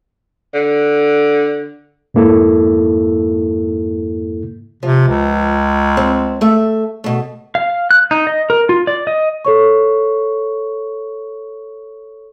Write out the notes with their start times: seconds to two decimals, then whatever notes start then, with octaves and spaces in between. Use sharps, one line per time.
0.54 D3
2.14 F2 G#2 A#3 E4 A4
4.83 C3 F3
5.07 C#2
5.97 C4
6.41 A3 E5
7.04 B2 A3
7.55 F5
7.91 F#6
8.11 D#4
8.27 D#5
8.50 A#4
8.69 F4
8.87 D5
9.07 D#5
9.45 A4 C#5 C#6